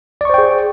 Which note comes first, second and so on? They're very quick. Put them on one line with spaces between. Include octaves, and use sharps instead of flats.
D5 C#6 C5 G5 G#4